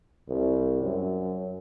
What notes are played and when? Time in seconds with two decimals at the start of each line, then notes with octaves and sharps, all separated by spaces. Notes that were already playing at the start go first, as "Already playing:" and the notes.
0.29 C2
0.82 F#2